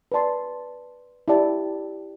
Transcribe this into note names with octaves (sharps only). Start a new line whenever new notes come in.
B4 D5 A5 C6
E4 G4 D5 A5